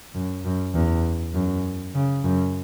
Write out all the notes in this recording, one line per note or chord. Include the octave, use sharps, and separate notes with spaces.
F#2
F#2
E2
F#2
C#3
F#2